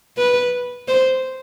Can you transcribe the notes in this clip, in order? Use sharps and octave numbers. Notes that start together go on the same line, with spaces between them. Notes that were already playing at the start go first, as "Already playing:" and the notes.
B4
C5